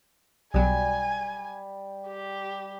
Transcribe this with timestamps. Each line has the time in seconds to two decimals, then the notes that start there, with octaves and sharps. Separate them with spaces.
0.54 B1 B2 F#3 G3 G#5
2.07 G4